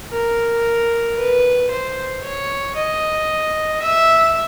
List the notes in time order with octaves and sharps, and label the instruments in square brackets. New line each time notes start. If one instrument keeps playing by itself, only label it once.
[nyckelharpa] A#4
B4
C5
C#5
D#5
E5